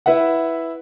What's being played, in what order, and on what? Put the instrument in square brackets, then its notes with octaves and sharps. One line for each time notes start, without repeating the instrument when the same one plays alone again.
[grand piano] E4 B4 E5 F#5